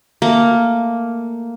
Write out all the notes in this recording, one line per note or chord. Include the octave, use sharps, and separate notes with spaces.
A3 A#3